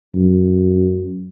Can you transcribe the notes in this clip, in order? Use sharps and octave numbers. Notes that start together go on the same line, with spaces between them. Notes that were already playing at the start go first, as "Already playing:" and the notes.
F#2